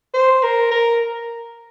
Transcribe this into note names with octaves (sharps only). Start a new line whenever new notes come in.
C5
A#4
A#4